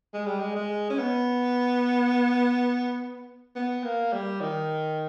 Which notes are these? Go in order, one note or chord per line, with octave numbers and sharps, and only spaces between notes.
G#3
G3
G#3
G#3
C#4
B3
B3
A#3
G3
D#3